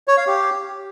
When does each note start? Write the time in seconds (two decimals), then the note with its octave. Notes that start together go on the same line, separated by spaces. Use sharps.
0.08 C#5
0.17 F5
0.27 G4